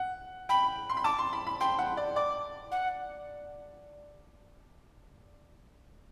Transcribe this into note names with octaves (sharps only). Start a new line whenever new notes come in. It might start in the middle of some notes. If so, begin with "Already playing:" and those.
Already playing: F#5
G5 B5
C6
B5
A5 D6
C6
B5
B5
G5 C6
F#5
D5
D5 D6
F#5